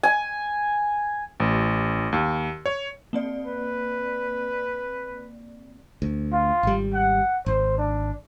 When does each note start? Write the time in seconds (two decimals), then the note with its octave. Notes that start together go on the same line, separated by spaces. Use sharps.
0.03 G#5
1.40 A1
2.12 D#2
2.66 C#5
3.13 A#3 C4 D5
3.47 B4
6.02 D2
6.33 F4
6.63 G#1 G3
6.94 F#5
7.46 G#1 C5
7.78 D4